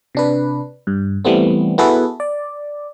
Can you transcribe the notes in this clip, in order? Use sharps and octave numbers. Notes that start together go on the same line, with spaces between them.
C3 D4 B4
G2
E3 G3 A3 B3 C4
B3 E4 F#4 G#4 A4 B4
D5